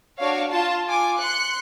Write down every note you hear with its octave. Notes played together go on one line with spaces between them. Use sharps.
D4 F#4 C#5 F5
F4 A5
F4 G#5 D6
C6 F#6 C#7